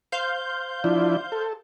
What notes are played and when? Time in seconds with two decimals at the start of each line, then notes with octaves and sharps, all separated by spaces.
0.12 C5 F5 G6
0.84 F3 D4 E4
1.32 A4